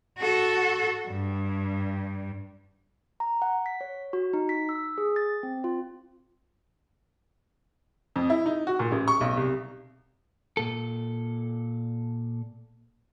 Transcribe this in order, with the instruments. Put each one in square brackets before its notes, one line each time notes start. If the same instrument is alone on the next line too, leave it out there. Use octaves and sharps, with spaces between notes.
[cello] F#4 A4
G2
[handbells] A#5
F#5
B6
C#5
F#4
D#4
B6
E6
G#4
A6
C4
F4
[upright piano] F2
E4
D#4
F#4
A#2
A1
C#6
B1
C2
[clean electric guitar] A#2 A4